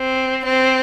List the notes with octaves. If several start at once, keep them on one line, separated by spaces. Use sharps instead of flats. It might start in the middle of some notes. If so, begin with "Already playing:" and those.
Already playing: C4
C4